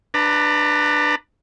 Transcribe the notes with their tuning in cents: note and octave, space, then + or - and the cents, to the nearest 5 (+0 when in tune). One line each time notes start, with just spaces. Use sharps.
D4 +15 B4 +0 A#5 -30